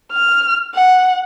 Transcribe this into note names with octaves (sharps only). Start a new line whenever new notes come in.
F6
F#5